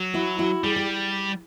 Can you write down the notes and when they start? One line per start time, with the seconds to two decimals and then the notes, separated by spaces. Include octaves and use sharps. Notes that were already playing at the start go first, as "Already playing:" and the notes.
Already playing: F#3
0.14 E4 F#4
0.39 E4 F#4
0.64 G3 G#4
0.76 G4